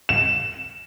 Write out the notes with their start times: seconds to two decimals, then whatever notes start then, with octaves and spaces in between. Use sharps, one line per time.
0.09 E7